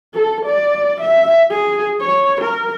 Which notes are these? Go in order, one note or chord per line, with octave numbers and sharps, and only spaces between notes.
A4
D5
E5
G#4
C#5
A#4